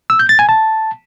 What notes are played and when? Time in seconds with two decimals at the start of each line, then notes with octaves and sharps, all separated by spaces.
0.10 E6
0.19 G6
0.29 A6
0.39 G#5
0.49 A5